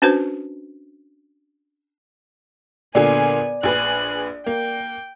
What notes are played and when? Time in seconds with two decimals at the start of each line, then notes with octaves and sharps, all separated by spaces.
0.02 C#4 D4 F#4 B4 C5
2.95 A#2 D3 B3 G#4 D5 G#5
3.63 A#1 G#4 B4 F#6
4.46 A#3 G5